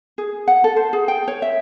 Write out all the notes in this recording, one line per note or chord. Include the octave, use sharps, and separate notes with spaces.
G#4
F#5
A4
C5
G#4
G5
C#5
E5